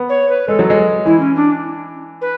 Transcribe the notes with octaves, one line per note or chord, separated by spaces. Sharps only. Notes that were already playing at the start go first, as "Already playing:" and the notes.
Already playing: B3
C#5
B4
G#3 A4
F#3
G#3
E3 E4
C#4
D4
B4